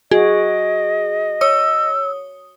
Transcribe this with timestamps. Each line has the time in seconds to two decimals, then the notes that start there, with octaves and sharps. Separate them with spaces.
0.11 F#4 G#4 D#5
1.41 C#5 D#6 E6